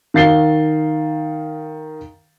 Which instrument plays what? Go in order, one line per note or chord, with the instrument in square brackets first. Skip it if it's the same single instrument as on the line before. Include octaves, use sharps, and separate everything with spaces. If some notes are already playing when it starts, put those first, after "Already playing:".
[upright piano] D#3 F5 A6 C7 G7